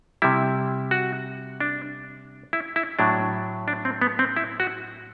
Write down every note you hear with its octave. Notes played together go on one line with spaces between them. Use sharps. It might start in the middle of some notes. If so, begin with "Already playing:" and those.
C3 G3 E4
F#4
D4
E4
E4
A2 F#3 D4
D4
C4
B3
C4
E4
F#4